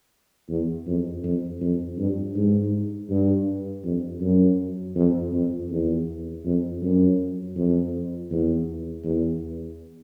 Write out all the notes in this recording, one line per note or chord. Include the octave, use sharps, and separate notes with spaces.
E2
F2
F2
F2
G2
G#2
G2
F2
F#2
F2
F2
E2
F2
F#2
F2
E2
E2